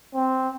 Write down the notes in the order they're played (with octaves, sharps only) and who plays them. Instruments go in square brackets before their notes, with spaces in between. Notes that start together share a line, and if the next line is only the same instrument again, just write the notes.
[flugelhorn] C4